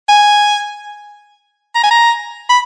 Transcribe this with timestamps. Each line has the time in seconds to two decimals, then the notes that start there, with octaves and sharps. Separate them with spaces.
0.09 G#5
1.75 A#5
1.83 G#5
1.91 A#5
2.50 B5